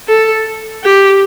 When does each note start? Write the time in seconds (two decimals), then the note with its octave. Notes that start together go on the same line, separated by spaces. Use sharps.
0.08 A4
0.84 G4